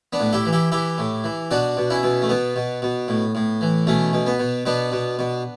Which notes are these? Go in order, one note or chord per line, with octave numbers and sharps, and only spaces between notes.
B3 D4
A2
E4 G4
E3
E4 G4
E3 E4 G4
A2
E3
B2 D4 F#4
B2
C#4 E4
B2
A3
B2 B3
B2
B2
A2
A2
E3
B2 A3 C#4
B2
B3
B2
B2 B3 D4
B2
B2